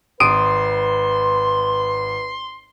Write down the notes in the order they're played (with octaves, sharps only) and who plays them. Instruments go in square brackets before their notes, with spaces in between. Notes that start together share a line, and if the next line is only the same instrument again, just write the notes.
[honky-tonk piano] G#1 [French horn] B4 [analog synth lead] C6 [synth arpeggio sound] D#6 D7 D#7